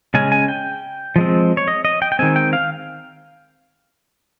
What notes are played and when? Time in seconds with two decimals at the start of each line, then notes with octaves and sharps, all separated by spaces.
0.14 C#3 G#3 C#4 G#5
0.32 G#5
0.48 G5
1.16 F3 G#3 C4
1.57 C#5
1.68 D#5
1.85 D#5
2.02 G5
2.12 G5
2.19 D#3 G#3 C4 G#5
2.36 G5
2.53 F5